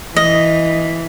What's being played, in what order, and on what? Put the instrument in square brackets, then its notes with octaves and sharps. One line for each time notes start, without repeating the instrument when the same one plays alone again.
[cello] E3 [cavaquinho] D#5